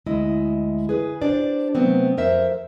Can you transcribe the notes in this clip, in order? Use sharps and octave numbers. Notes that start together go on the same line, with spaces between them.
D2 G#3 E4 D#5
G#4 B4
D4 G4 C5 D5
C3 F#3 A3 B3 C4
F2 A#4 C5 E5